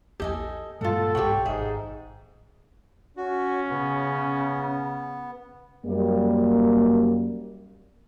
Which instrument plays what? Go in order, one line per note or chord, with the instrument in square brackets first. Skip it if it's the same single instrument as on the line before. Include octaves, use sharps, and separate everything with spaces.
[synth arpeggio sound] A#1 E2 G4 [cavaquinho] A4 D#5 G#5
[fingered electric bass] G2 A#2 G#3 [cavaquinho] F4 F#5 [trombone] A4
[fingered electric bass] B1 G#2 [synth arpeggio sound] G4 F#5 [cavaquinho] C#5 G5
[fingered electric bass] G#1 [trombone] G#2 [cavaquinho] G#4 [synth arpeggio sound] E5
[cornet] C#4 [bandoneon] F#4
[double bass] C#3 [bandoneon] B3
[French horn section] F#2 G3 A#3